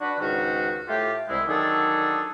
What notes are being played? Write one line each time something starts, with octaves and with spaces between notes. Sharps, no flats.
D4 F#4 B4
C#2 G#2 D#3 C#4 F#4
A2 A3 F4 G4
C2 G#3 E4
D3 D#3 F#3 D4 G#4 A4